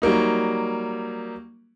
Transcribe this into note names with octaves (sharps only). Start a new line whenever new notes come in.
F#3 G3 A#3 D#4